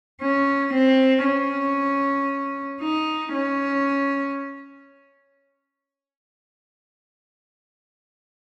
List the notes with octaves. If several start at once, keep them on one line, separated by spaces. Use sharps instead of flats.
C#4
C4
C#4
D#4
C#4